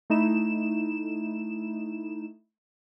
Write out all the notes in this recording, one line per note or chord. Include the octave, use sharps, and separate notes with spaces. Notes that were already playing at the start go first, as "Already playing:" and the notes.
A3 D#4 E4 E7